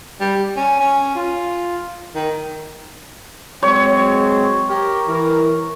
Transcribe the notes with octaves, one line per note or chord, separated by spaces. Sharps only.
G3
C#4
C#4
F4
D#3
F#3 G#3 C4 C#5
G4 A#4
E3 A#4